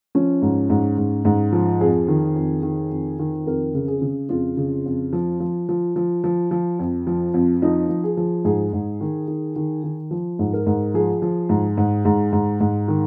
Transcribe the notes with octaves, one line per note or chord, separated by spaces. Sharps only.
F3 C#4
G#2
G#2
G#2
G#2
F3
F2 G#4
D#3
F2
D#3
F2
D#3
F2 A#4
C#3
G#4
C#3
F2 F4
C#3
F2
F3
F3
F3
F3
F3
F3
F2
F3
F2
F3 D#4
F3
G#4
F3
G#2 G#4
G#2
D#3
D#3
D#3
D#3
F3
G#2
A#4
G#2
F3 G#4
F3
G#2
G#2
G#2
G#2
G#2
D#3